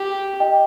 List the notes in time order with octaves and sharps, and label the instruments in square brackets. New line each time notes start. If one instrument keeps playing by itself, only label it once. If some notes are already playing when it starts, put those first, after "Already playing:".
Already playing: [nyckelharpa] G4
[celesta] D#5 G5